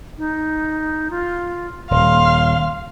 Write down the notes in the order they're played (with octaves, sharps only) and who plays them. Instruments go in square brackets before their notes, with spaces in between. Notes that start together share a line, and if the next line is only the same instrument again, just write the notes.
[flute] D#4
F4
[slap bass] D#1 [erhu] F5 [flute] C6